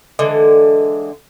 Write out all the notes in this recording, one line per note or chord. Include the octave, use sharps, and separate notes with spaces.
D3 E3 G#3